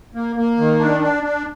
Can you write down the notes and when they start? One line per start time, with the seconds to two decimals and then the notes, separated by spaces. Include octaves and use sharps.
0.14 A#3
0.36 A#3
0.57 D#3
0.79 D4
1.01 D4
1.23 D4